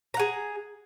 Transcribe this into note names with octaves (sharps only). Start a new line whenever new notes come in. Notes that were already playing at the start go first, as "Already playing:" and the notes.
G#4 F#5 A#5